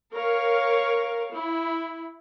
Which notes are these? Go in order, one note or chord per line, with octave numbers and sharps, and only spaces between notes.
A#4 C#5 F5
E4